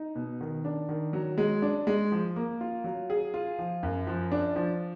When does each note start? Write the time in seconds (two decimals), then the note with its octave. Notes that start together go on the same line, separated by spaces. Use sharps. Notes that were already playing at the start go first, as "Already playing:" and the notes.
Already playing: D#4
0.15 B2
0.41 D#3
0.65 D4
0.89 D#3
1.13 F#3
1.38 G#3
1.62 D4
1.87 G#3
2.12 F3
2.36 A#3
2.61 F4
2.84 F#3
3.10 G#4
3.34 F4
3.59 F3
3.83 F#2
4.07 F3
4.32 D4
4.56 F3